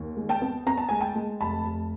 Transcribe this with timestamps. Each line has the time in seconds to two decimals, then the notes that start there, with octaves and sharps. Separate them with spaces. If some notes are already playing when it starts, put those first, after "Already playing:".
Already playing: D#2
0.17 G#3
0.29 G5 A5
0.42 B3
0.66 B3 A#5
0.78 A5
0.89 G#3 G#5
1.01 G5 A5
1.16 G#3
1.41 F1 A5 B5
1.65 F1